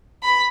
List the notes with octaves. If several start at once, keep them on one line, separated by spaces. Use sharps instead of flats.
B5